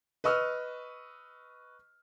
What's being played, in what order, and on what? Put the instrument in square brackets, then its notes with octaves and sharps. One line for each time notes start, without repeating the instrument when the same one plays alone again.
[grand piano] B4 D#5 C#6 E6 F6